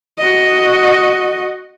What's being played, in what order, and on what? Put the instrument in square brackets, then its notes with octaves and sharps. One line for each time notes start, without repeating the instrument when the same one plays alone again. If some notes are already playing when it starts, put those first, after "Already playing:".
[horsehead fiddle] F#4 D#5